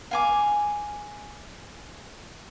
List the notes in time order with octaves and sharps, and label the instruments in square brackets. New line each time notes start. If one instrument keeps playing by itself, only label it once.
[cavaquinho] F5 G#5 D6